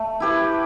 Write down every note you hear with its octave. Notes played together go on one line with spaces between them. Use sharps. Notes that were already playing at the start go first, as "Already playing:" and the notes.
Already playing: A3
E4 G4 B4